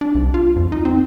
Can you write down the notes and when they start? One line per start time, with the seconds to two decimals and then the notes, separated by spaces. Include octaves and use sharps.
0.01 D4
0.15 C2
0.34 F4
0.56 F2
0.72 D#4
0.85 C4